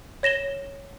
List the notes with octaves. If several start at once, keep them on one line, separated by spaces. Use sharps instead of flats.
C#5 A#6 E7 G7